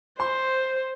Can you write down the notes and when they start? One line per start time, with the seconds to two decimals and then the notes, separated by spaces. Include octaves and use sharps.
0.20 C5 C6